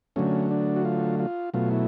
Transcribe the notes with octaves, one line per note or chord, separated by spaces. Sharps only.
D3 F#3 A3 C#4
D4
F#4
F4
F4
B2 F#3 A3 F4
E4